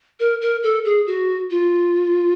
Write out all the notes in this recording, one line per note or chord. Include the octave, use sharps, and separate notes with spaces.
A#4
A#4
A4
G#4
F#4
F4